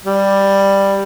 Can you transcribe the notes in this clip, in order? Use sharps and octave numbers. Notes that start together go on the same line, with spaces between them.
G3